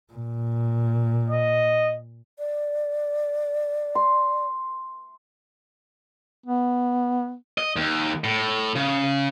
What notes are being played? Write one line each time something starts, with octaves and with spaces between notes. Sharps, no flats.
A#2
D#5
D5
C6
B3
D#5
D#2
A2
C#3